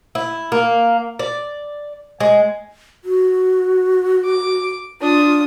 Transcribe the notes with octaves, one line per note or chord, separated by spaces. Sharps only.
E4
A#3
D5
G#3
F#4
D6
D4 F4 D#6